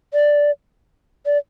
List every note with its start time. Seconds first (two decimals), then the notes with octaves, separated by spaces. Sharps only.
0.14 D5
1.26 D5